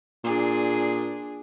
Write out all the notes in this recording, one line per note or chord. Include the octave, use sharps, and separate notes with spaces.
A#2 D4 G#4